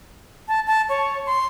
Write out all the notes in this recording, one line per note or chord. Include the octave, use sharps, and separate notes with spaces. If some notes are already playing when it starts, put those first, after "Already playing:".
A5
A5
C#5
C6